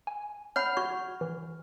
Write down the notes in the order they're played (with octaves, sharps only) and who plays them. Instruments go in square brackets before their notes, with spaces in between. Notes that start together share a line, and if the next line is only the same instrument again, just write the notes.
[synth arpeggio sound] G#5
[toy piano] C#5 F#5 B5 [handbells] F6
[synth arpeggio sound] F#4 G#6 [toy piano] C#6
[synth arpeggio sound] E3